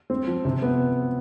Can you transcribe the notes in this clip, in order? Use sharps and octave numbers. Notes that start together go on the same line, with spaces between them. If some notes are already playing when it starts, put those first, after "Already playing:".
C4
F3
C3
B3